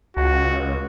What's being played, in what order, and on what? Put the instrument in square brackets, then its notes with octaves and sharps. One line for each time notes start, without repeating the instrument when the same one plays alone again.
[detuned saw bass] C#2 [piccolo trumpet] F#4